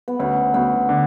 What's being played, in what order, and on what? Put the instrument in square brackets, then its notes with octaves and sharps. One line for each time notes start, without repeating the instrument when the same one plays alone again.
[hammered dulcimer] B3
[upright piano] D2 [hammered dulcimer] C#4
[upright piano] D2 [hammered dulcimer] B3
[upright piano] D3